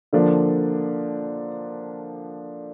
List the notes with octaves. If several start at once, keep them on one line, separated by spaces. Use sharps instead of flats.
D3 F3 A#3 D4